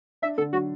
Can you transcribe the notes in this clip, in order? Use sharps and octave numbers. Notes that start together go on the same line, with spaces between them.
D4 E5
D3 A4
F#3 F#4